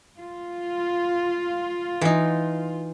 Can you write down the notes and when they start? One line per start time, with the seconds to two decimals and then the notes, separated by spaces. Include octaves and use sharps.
0.20 F4
2.01 E3 D#4